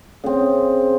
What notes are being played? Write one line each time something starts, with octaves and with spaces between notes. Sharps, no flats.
C#3 C4